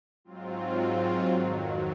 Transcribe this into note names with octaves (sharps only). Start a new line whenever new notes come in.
G#2 F#3 C4 F4
F2 D#3 F#3